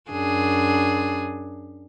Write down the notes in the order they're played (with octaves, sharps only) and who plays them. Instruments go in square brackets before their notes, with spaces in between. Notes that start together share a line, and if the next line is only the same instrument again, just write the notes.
[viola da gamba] F#2 D4 G#4